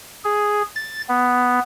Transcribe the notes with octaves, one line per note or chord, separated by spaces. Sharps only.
G#4
A6
B3